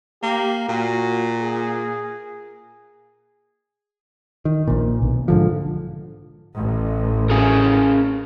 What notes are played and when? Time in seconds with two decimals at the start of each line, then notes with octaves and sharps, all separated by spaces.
0.23 A#3 G4
0.68 A#2 F#4
1.39 G#4
4.45 D#3
4.67 A#1 A#2
5.02 B1
5.28 G#2 D3 F3
6.57 A1
7.30 C#4 G#4 A#4